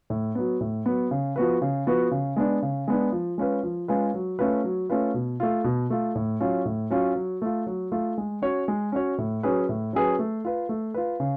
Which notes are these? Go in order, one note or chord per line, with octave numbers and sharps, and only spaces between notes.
A2
F#3 B3
A2
F#3 B3
C#3
F3 B3 F#4 B4
C#3
F3 B3 F#4 B4
C#3
G#3 B3 D4
C#3
G#3 B3 D4
F3
G#3 C#4 F4 B4
F3
G#3 C#4 F4 B4
F#3
A3 C#4 F4 B4
F#3
A3 C#4 F4 B4
B2
A3 F4
B2
A3 F4
A2
F#3 C#4 F4
A2
F#3 C#4 F4
F#3
A3 F4
F#3
A3 F4
G#3
C#4 F#4 C#5
G#3
C#4 F#4 C#5
A2
F#3 C#4 G#4 B4
A2
F#3 C#4 G#4 B4
A3
F4 B4
A3
F4 B4
C#3